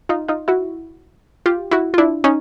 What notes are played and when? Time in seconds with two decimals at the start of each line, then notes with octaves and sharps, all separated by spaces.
0.09 D#4 F4
0.28 D#4 F4
0.48 E4 F#4
1.46 F4 G4
1.71 E4 F#4
1.94 F4
1.98 D4 E4
2.24 C#4 D#4